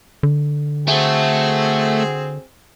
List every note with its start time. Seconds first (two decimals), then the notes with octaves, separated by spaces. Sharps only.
0.23 D3
0.88 A3 C4 F#4 G#4